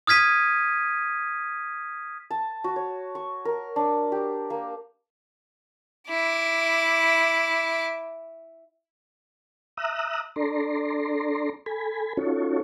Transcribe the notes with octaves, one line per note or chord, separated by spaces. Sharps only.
D#6 F6 G#6 B6 D#7
A5
F#4
C#5
C#6
A#4
D4
G4
A#3
E4 D6
E5 A#5 D#6 E6 F#6
D4 A4 D5 A#5 C6
A4 G#5 B5
C#4 D#4 F4 F#4 A4 C#5